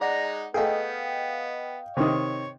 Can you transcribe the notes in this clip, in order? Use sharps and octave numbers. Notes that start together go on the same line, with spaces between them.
G#3 D#4 D5 F#5 A#5
A3 B3 G#4 D#5 F5 G5
C3 D#3 C#5